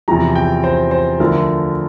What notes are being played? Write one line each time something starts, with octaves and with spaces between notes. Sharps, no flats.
E2 C3 F3 A#5
G5
C5
C5
D2 D3 F3 A#4